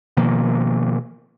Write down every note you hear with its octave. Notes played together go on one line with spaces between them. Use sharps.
B2 D#3 F3 A#3